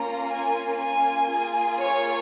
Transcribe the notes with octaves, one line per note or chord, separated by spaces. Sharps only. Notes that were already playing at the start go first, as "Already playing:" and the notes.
Already playing: A#3 C#4 F4 A#5
G#5
G#5
A#3 F4 G#4
C#5